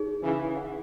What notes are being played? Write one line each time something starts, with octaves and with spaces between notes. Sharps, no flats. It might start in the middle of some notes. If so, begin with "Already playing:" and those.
Already playing: D#4 G#4 C#5
C#3 E3
G#4 C#5 F#5